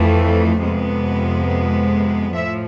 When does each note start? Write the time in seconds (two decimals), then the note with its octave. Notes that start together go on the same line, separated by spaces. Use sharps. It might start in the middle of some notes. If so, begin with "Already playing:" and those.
Already playing: F2 E3 A3
0.61 F2 C3 G#3 B3
2.34 A2 F3 E5